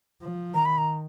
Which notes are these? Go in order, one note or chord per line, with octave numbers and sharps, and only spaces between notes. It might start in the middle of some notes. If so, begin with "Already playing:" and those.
F3
D#3 A#5
B5
A#5